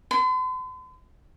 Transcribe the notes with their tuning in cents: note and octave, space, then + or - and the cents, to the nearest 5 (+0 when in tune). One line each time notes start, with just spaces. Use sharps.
C6 -45